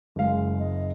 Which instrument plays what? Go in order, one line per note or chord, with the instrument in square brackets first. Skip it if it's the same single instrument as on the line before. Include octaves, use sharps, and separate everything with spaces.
[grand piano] F#1 F5 [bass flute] G#3
[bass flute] D#5